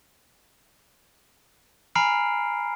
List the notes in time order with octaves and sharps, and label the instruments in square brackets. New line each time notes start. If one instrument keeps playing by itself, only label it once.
[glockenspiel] G#5 A#5 B5 F6 C7 D7